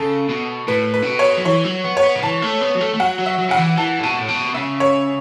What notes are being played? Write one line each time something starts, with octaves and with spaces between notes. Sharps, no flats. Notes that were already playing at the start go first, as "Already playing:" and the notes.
Already playing: C#3 A4
B2
A2 B4
B4
C#3
B2
C#5
F#3
E3 C#5
F#3
B3
C#5
B3
C#3
E3 A5
A3
B3
F#3
A3
A3
F#3 F#5
F#3
E5
F#3
C#3 F#5
E3
E3 A5
A2
B2 A5
A2
B2
C#3 E5
C#5